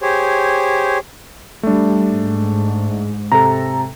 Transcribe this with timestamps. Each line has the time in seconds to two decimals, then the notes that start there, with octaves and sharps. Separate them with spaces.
0.01 G4 G#4 C5 C#5
1.63 G3 A3 D4
2.09 G#2
3.32 C3 A4 A#5